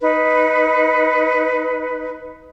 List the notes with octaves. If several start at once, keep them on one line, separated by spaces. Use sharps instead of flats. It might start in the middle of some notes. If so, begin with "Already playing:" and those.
D#4 B4